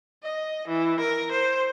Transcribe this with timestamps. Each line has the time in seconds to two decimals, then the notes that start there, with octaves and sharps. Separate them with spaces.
0.24 D#5
0.68 E3
1.00 A#4
1.32 C5